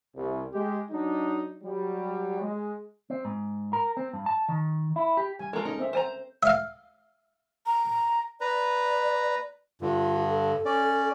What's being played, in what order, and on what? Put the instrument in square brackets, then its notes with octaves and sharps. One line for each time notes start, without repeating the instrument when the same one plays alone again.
[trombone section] C2
G#3 G4
F#3 D4 D#4
F#3 G3
G#3
[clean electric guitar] C4
G#2
A#4
C4
G2
A5
D#3
E4
G4
[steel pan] G3 G#5
[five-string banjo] G#3 F4 [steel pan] A4 A#4
[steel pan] G#3 C#4 [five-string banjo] D#4
[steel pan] C4 E5
[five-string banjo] C5 G#5 A#5
[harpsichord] E5 F5
[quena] A#5
[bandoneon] B4 A#5 [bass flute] D5
[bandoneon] G2 D3 [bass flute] F4
[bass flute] A4
[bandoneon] C#4 D5